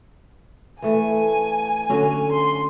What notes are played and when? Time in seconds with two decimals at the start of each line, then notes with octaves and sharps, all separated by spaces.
0.82 E3 A3 G#5
1.90 D3 F#3 C#4
2.32 C6